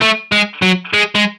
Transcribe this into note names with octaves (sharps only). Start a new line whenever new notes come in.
A3
G#3
F#3
G#3
G#3